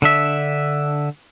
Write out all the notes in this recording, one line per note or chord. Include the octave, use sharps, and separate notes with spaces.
D3 D4 E5